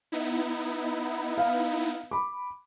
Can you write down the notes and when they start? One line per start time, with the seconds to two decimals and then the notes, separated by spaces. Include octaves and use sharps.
0.12 B3 D#4 E4
1.38 F5
2.11 B5 D6